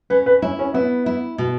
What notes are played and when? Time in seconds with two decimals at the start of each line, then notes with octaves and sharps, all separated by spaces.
0.10 C#4 B4
0.26 B4
0.42 C#4 E4
0.59 C#4
0.74 B3 E4
1.06 E4
1.38 B2